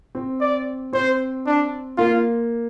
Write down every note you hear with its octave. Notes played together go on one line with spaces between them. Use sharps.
C4
D5
C4 C5
D4
A#3 F4